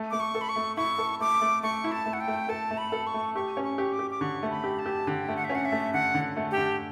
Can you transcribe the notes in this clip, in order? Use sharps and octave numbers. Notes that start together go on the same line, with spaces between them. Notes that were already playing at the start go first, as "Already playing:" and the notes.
Already playing: A3
A3 D6
C#6
A4
B5
C#6
A3
E4 C#6
A4
A3 D6
A3
A3 C#6
E4
A5
A3
F#5
G5
A3
A4 A5
A3
B5
A4
C#6
A3
G4 C#6
C#4
C#6
G4
D6
G4
D6
D3 C#6
A3
B5
G4
A5
G4
D3 G5
A3
F#5
E5
C#4
F#5
E5
A3
D3 F#5
D3
A3
G4
D3